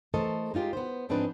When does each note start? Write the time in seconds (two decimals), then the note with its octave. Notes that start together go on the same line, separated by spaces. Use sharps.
0.14 E3 A3 A4 A#4 C5 D#5
0.54 G#3 D#4 F4 G4 A#4
0.73 B3 C5
1.09 G#2 F3 C4 D4 D#4 B4